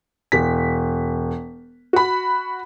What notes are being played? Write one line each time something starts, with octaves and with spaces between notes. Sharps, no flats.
E1 B6
F#4 B5